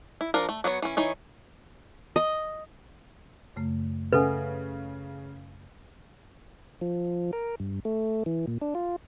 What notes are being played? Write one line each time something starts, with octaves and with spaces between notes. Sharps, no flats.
E4
F3 D4 A#4
A3
F#3 B3 G#4 C#5
E3 C#4
E3 D#4 C#5
D#5
F#2 C#3 A3
C#3 A4 B4 E5 F#5 G#5
F3
A#4
G2
A3
E3
A#2
D4
F4